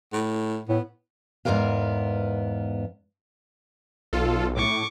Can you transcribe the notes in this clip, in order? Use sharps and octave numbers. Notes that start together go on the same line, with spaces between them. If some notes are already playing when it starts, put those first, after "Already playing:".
A2
A2 B3
E2 G#2 E3 B3 A#4 F5
B1 F4 A4
A2 C#6 D6